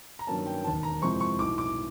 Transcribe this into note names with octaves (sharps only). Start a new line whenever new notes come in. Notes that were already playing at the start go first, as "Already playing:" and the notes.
A#5
G2 D#3 F#3 A#3 C#4 A5
G5
E1 D#2 D#3 A5
A#5
F2 C3 E3 G#3 C4 C#6
C#6
B1 A2 E3 D6
D6